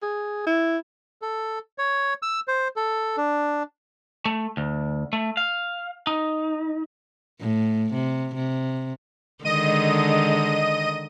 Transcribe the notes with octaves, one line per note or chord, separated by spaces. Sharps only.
G#4
E4
A4
C#5
E6
C5
A4
D4
A3
D2
A3
F5
D#4
A2
C3
C3
D3 D#3 G#3 D#5 D#7